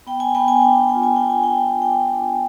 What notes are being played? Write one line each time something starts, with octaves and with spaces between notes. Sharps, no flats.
B3 G5
G#5
B3 G5
G#5
D4 G5
G#5
F4 G5
G#5
G5
B3
G#5
G5
D4
D4 G5
D4